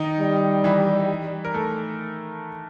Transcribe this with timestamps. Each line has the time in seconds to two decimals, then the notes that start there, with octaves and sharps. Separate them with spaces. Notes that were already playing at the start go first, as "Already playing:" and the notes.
Already playing: D#3 D#4
0.19 G3
0.64 E3 E4
1.45 A#4
1.54 A3 A4